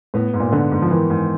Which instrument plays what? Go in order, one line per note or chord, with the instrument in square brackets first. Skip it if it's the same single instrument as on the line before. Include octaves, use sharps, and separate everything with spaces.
[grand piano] A2 [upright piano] B3
[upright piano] G#2
[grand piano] A#2
[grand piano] D3 [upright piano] B3
[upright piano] G#2
[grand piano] F3
[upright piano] D#3 [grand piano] E3
[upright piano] G#2